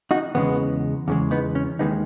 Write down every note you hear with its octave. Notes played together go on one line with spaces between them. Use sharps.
D#4 F#4
E2 C#3 G#3 B3
E2 C#3 G#3
B3 D#4
C#4
D#2 D#3 G#3 B3 D#4